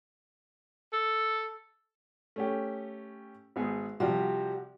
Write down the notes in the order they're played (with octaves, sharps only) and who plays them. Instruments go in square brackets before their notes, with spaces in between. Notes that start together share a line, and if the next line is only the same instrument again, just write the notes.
[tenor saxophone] A4
[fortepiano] A3 C#4 G4
G#1 B3 G#4
[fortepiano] C3 F3 G3 [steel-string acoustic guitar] F#4 G4